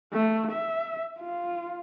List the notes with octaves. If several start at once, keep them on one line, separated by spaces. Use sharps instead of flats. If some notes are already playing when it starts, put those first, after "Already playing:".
A3
E5
F4